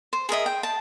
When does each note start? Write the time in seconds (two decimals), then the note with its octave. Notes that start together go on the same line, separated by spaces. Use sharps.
0.13 C5
0.29 G#4 A#4 D#5 E5
0.46 G5
0.63 A5